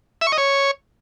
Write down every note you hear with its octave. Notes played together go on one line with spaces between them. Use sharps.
E5
C#6
D#5
C#5